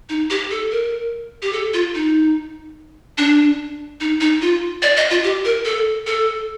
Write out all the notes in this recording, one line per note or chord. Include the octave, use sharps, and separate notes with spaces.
D#4
G4
A4
A#4
G4
A4
F4
D#4
D4
D#4
D#4
F4
D5
D#5
F4
G4
A#4
A4
A4